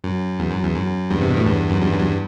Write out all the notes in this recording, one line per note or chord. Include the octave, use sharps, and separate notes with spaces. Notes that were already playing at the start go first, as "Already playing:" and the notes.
F#2
E2
F#2
E2
F#2
E2 G2
C3
B2
A2
E2 G2
F#2
E2 G2
F#2
E2 G2